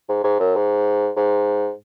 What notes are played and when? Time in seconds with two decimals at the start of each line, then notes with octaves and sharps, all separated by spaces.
0.09 G#2
0.24 G#2
0.40 F#2
0.55 G#2
1.17 G#2